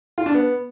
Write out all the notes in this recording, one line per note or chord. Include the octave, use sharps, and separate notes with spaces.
F4
D4
B3